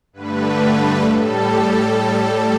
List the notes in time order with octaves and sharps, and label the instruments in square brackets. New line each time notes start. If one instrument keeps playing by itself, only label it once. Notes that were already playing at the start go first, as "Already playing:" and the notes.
[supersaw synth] G2 D3 A3 B4
A2 G3 A4